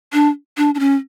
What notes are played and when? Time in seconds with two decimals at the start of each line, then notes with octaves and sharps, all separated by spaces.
0.13 D4
0.57 D4
0.75 D4
0.80 C#4